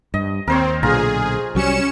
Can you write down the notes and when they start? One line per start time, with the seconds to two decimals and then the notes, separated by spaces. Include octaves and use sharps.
0.14 G2 D#5
0.47 D#2 C4 A#4 C5 C#5
0.83 B1 A#2 D3 F4 G#4 F5 A#5
1.55 C2 F#3 G3 C#4 C#7 E7